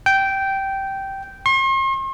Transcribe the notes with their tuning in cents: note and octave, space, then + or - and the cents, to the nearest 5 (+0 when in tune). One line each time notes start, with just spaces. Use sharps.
G5 -10
C6 +45